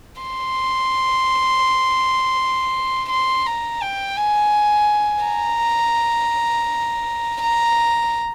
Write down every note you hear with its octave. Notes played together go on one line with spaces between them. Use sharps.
C6
C6
A#5
G5
G#5
A#5
A#5